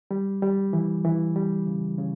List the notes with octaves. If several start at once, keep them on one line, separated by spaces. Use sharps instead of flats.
G3
G3
E3
E3
G3
C#3
C#3